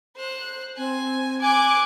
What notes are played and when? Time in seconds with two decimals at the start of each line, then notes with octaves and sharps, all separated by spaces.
0.17 C5 F#6
0.77 C4 G#5
1.43 G#5 D6 F#6 G#6